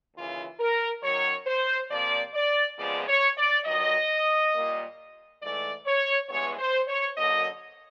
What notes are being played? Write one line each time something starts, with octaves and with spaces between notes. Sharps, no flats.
D#2 C#3 E3 F4
A#4
F#2 D#3 F#3 C#5
C5
C3 F3 A#3 D5
D5
F2 C#3 F3 G#3 B3 D5
C#5
D5
G2 D#3 F#3 D#5
A#2 G3 A#3
G#2 E3 A3 D5
C#5
G2 E3 G#3 B3 C#5
C5
C#5
F#2 D3 F#3 A#3 D#5